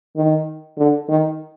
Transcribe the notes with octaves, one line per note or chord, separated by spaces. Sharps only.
D#3
D3
D#3